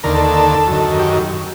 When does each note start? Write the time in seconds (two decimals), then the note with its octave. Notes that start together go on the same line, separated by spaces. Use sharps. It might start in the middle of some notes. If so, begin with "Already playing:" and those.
0.04 D#2 D3 A#4
0.14 A4
0.25 A4
0.67 F#2 D#3
0.99 G4